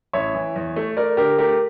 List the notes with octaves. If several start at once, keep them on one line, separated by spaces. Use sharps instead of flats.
A1 C#5 E5
E3
E2
A3
A3 A#4 D5
D3 G4 A#4
A3 G4 A#4